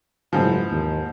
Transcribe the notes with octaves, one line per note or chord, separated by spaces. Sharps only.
F#1 G#2 E3 F3
D#2